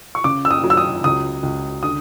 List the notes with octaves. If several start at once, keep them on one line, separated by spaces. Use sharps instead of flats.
C#6
C#3 D6
E6
D#6
F#3
E6
D#6
C#2 D#6
C#2
D3 D#6